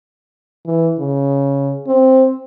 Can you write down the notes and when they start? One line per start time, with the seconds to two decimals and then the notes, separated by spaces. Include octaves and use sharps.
0.66 E3
0.99 C#3
1.87 C4